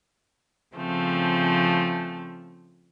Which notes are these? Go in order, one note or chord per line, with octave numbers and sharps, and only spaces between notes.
C#3 F3 A3 C4